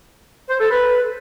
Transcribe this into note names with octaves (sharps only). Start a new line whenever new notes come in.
C5
A4
B4